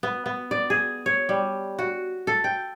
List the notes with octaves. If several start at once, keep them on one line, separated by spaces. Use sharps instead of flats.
B3
B3
D5
G#4
C#5
G3
F#4
A4
G5